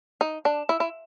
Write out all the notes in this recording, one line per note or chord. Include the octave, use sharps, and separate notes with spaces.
D#4
D4
E4
E4